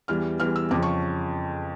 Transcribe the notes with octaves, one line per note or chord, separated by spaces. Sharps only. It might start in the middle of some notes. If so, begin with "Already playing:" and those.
E2 E3 G3 F6
E2 E3 G3 F6
E6
F2 C#3 F3 D6
C#6